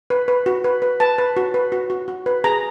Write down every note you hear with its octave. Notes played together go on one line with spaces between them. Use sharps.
B4
B4
F#4
B4
B4
B4 A5
B4
F#4
B4
F#4
F#4
F#4
B4
G#4 A#5